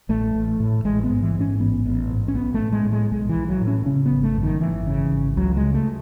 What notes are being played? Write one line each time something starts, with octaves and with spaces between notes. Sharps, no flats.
A1 A3
A1
A2
A1 G#3
B3
G#2
E3
G#2
C#4
A1 B3
A1
G#2
C#4
B1 B3
A3
A2
G#3
A2
G#3
B1 G#3
E3
B1
F#3
A2
C#4
C#3 C#4
B3
G#1
A3
F#2
D#3
G#1 E3
C#3
G#1
C#2 F#3
G#3
C#3
A3